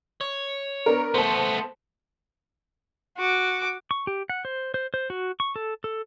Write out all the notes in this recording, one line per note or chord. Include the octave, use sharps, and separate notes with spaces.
C#5
B3 D4 A#4
A3 B3 C5 A5
F#4 D6
C#6
G4
F#5
C5
C5
C5
F#4
C#6
A4
A4